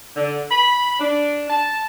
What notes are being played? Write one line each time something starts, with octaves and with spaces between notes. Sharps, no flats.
D3
B5
D4
A5